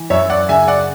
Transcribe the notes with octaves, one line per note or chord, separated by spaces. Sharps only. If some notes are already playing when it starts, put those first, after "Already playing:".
Already playing: E3
F#2 C#5 E5
D5 F#5
C#3 E5 G#5
D5 F#5